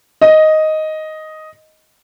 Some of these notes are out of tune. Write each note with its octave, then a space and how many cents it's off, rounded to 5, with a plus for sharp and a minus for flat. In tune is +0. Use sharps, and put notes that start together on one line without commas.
D#5 +5